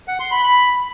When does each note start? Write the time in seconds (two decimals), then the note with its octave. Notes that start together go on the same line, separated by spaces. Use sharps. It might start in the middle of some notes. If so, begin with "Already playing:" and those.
0.08 F#5
0.20 C6
0.31 B5
0.43 B5